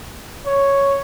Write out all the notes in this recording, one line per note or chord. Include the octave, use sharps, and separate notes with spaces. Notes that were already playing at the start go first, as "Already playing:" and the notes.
C#5